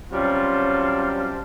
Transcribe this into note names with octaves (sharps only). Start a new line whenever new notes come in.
C3 F#3 G3 C#4 F4 A5